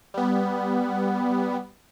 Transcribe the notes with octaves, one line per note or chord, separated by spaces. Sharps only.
G3 B3